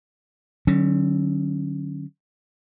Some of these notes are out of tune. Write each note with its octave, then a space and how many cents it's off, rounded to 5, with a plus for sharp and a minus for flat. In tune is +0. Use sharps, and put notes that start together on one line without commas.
D3 +40 F#3 +20 C#4 -10